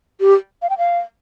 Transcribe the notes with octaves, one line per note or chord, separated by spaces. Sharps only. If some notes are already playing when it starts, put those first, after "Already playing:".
G4
F5
G5
F5